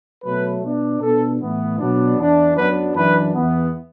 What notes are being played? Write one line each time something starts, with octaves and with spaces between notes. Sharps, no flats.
B2 F#3 A3 B4
B2 B3 D4
B2 B3 D4 A4
A2 E3 B3
B2 F#3 B3 D4
E2 E3 D4
F#2 F#3 B3 D4 B4
F#2 E3 D4 B4
E2 E3 B3